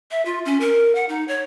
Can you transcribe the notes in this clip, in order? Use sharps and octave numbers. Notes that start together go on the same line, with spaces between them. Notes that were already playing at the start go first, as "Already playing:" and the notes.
E5
F4
C#4
A#4
F#5
D#4
C#5